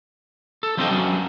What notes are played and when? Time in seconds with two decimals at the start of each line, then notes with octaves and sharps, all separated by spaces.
0.63 A4
0.77 F3 G3 C4 D4 D#5 G5
0.91 F#3 B3 C#4 D4